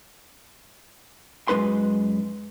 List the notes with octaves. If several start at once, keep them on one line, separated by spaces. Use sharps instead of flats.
F#2 G#3 D#4 B4 C6